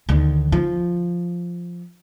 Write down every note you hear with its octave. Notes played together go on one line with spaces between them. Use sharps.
D2 D#3
F3